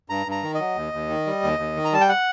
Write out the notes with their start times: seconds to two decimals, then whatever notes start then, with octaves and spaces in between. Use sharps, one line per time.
0.10 G2 A#5
0.26 G2
0.31 A#5
0.43 D#3
0.55 D#5
0.60 F#3
0.76 D#2
0.93 D#2
1.09 D#3
1.26 G3
1.43 D#2
1.59 D#2
1.77 D#3
1.85 A#5
1.92 G3 A5
2.01 G5
2.09 F#5